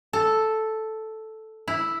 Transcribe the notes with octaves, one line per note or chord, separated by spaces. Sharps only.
A4
E4